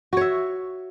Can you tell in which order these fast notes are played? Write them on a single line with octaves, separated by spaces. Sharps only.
F#4 C#5 E5